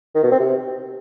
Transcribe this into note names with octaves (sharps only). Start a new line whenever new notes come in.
D#3
B2
C4
C3